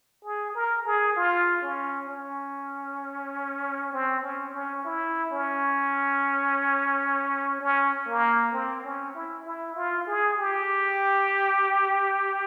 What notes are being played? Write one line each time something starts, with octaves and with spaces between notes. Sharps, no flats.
G#4
A#4
G#4
F4
C#4
C#4
C4
C#4
C#4
E4
C#4
C#4
A#3
C4
C#4
E4
E4
F4
G#4
G4